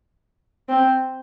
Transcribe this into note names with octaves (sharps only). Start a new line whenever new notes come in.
C4